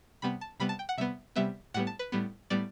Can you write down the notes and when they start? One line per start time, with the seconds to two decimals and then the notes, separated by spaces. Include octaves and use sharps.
0.22 C3 G3 B3 B5
0.41 A5
0.60 C3 G3 B3 B5
0.69 A5
0.79 G5
0.89 F#5
0.98 C3 G3 B3 E5
1.36 C3 G3 B3 E5
1.74 A2 G3 B3 F#5
1.87 A5
1.99 B4
2.12 A2 G3 B3
2.50 A2 G3 B3 D5